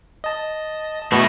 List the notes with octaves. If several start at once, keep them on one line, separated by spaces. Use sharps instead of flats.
D#5 A5
B2 A3 E4